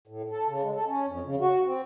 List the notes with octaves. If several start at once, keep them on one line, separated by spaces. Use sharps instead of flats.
A2
A4
C#3
G#3
A4
C#4
F2
C#3
F#4
C4